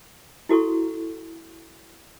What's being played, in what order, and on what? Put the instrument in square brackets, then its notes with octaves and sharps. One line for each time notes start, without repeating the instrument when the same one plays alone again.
[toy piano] E4 F#4 A4 C#6